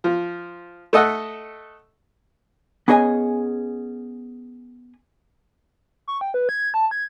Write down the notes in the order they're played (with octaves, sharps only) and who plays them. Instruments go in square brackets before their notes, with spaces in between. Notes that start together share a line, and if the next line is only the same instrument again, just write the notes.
[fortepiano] F3
A3 A4 D#5 E5 F#5
[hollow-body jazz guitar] B3 C#4 G#4 D#5 G#5
[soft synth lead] C#6
G5
B4
G#6
A5
G#6